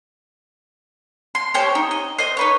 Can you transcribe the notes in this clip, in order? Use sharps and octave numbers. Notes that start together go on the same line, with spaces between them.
C6
G4 C5 C#5
D#4
D#5
C5 D#5
D#4 B4 C#5